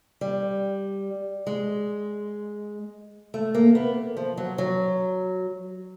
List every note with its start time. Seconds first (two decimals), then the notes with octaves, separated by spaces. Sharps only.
0.21 G3
1.47 G#3
3.34 A3
3.54 A#3
3.75 B3
4.17 F3
4.37 F#3
4.58 F#3